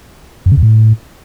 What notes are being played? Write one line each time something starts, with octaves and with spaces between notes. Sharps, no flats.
F#2
C#3
E2
A2